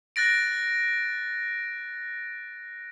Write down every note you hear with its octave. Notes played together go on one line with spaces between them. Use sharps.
F#6 A6 A#6 D7